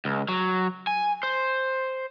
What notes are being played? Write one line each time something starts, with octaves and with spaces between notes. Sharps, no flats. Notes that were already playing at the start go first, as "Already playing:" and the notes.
C#2
F#3
G#5
C5